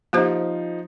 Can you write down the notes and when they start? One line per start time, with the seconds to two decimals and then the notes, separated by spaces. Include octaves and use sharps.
0.13 F3 A#3 D#4 G4 C5